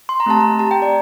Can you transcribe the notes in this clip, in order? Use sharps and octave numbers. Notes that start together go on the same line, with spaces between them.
C6
A#5
A3 C4 G4 A5
A#5
C4 G4 A5
G5
D5